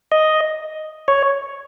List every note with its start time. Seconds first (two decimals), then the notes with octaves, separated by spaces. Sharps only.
0.12 D#5
1.08 C#5